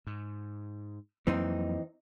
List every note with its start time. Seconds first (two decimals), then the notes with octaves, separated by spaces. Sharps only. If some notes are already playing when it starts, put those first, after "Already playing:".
0.07 G#2
1.27 F2 E3 F#3 A#3 C4 D#4